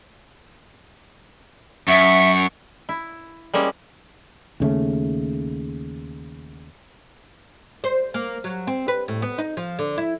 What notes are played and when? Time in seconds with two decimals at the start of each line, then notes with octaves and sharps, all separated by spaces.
1.88 F#2 E5 C#6
2.89 E4
3.54 G3 G#3 A#3 C#4
4.60 D#2 C#3 A3
7.84 C5
8.14 A#3
8.44 F#3
8.67 C4
8.88 B4
9.08 A2
9.22 B3
9.38 D#4
9.57 F3
9.79 D3
9.98 E4